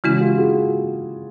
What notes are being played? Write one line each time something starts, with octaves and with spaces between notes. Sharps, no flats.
C#3 E3 G#3 C#4 E4 F#4
F4 G4
F#4 G#4